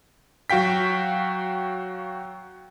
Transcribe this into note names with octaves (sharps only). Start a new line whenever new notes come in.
F#3 F#4 F5 G5 B6